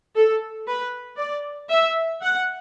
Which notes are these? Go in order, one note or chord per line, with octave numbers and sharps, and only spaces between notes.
A4
B4
D5
E5
F#5